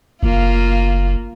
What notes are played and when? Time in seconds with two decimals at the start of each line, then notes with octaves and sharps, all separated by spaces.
0.23 F#1 A#3 F4